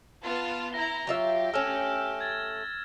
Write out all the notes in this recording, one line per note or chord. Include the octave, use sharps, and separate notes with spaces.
B3 F4 A5
E4 A#5 A#6 G7
F#3 F4 G4 E5
A3 C#4 E6 F6 E7
G#6 A6